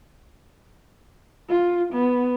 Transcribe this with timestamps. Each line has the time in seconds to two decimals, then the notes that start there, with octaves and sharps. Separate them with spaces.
1.49 F4
1.93 B3